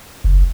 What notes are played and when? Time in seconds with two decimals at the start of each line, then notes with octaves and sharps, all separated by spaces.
0.24 F#1